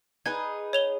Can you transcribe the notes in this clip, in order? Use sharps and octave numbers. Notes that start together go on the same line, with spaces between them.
D#4 G#4 B4 G#6
C#5 F7 G7